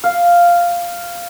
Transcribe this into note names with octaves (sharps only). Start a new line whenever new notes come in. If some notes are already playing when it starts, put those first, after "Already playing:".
F5